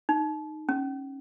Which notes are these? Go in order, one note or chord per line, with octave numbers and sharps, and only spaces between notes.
D#4
C#4